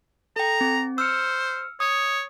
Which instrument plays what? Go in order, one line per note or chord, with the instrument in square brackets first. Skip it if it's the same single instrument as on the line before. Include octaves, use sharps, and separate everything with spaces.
[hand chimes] A4 G5 [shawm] A#5
[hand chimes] C4
[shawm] C5 [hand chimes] E6 F6 C#7
[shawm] C#5 [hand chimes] D#6